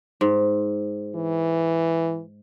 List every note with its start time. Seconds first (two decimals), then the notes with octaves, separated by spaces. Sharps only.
0.21 G#2
1.15 E3